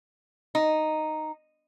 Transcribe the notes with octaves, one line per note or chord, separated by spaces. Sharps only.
D#4